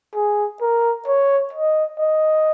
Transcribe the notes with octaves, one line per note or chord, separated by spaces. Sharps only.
G#4
A#4
C#5
D#5
D#5